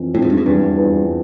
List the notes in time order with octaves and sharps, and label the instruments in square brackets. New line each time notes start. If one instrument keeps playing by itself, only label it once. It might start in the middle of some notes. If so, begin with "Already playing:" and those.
Already playing: [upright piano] F2 E3
[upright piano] F2 [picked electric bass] A2
[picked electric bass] G#2
G2
G#2
[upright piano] E2 [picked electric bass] G2
[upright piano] E2